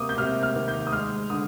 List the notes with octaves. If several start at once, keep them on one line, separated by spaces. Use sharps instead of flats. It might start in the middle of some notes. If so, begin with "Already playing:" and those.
Already playing: C3 A#3 D6 D#6
G6
C3 F6
F6
D#3
G6
D#6
G#3 F6
D3 D#6